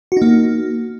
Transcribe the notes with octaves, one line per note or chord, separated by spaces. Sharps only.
A#3 D#4 F#4